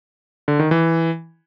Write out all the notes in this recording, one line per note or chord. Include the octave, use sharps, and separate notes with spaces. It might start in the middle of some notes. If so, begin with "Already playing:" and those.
D3
D#3
E3